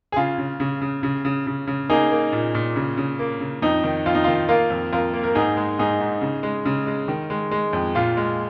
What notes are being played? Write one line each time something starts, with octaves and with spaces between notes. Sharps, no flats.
G#4
C#3 F4
C#3
C#3
C#3
C#3
C#3
C#3
C#3
A#3 D#4 G#4
A#3
A#2
A#2
C#3
C#3
A#3
C#3
F2 D#4
D#3
F2 F4
D#4
F4
D#3
A#3 F4 A#4
F2
F2 F4 A#4
A#3
A#4
G#2 D#4 G#4
G#3
G#2 D#4 G#4
G#2
C#3
G#3
C#3
G#3
D#3
G#3
G#3
F2
A#2 F4
G#3